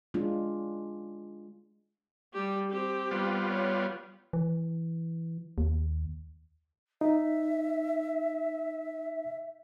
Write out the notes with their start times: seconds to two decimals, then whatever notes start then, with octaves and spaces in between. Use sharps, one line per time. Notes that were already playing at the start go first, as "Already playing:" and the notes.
0.14 G#3 D4 F4
2.33 G3 G4
2.71 C4 G4
3.11 G3 B3 F4
3.49 C#5
4.33 E3
5.58 D#2
7.01 D#4 E5